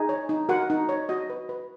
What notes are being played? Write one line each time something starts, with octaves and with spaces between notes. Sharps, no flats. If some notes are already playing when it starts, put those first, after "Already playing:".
Already playing: D#4 G#4 G#5
C#5
D#4
F#4 A#4 F#5
D#4
C#5
F#4 D#5
B4
B4